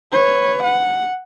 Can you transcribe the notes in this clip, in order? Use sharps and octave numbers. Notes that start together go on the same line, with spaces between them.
B4 C#5
F#5